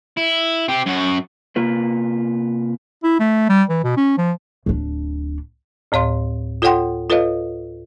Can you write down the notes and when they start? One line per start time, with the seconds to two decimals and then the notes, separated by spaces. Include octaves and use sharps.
0.17 E4
0.69 C4 G4
0.86 F#2 F#4
1.56 C3 A#3 F4 B4
3.03 E4
3.19 A3
3.49 G3
3.69 E3
3.84 B2
3.97 C#4
4.18 F3
4.66 D1 D4
5.92 D2 A2 C#5 F5 C6
6.62 F4 A4 C#5 F#5 G5 C6
7.10 F4 A4 B4 C#5 D#5 F5